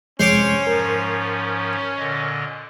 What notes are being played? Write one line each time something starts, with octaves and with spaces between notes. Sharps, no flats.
F2 C3 G#3 C#4 C5 C#5 D6
G#2 F3 A#4
A#2 D3 D#5